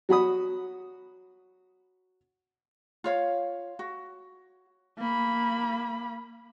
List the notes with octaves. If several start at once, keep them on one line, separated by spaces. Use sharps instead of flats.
F#3 F#4 B5 D#6
F4 C#5 F5
F#4
A#3 B5